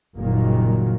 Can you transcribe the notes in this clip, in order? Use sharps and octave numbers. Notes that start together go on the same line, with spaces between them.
F#1 A#2 D#3 F#3 G3 A#3